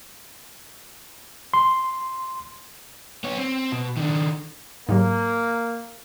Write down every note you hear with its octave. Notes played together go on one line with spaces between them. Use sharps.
C6
B3 C#5
C4
B2
D#3 D4
G#2 C3 F#3 A#3